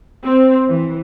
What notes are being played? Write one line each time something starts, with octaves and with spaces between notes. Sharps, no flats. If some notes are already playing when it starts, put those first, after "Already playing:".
C4
E3